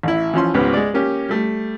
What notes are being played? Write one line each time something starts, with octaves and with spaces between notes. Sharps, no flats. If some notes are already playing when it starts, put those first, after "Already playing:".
A1 E4
E3 F3 C#4 C6
C#2 G#2 B3 C#4 G4 B4
G#3 D5
A#3 C#4 G4
G3 A3